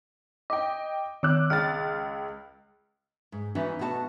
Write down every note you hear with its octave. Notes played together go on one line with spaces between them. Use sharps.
D#5 G5 D6
D#3 D6 E6 F#6
C#2 F6 A6
G#2
E3 C#4 D#4 F#4 D5 E5
B2 A3 D#4 F#4 E5 A5